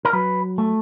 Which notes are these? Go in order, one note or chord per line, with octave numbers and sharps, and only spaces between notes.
A#4
F#3 B4
A3